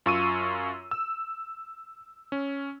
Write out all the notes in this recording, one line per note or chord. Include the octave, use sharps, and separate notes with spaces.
F#2 F4 C#6 E6 D#7
E6
C#4